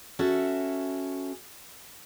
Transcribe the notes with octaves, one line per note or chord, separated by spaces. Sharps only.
C#4 F#4 A4 E5